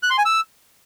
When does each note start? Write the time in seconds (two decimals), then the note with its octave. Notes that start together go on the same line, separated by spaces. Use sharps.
0.03 F#6
0.10 C6
0.18 G#5
0.25 E6